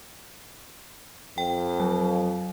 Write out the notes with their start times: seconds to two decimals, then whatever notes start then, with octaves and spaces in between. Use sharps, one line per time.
1.38 F2 G5
1.80 F#3